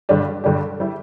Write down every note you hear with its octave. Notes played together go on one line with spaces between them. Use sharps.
G2 D3 G3 D4 G4
G2 D3 G3 D4 G4
G3 E4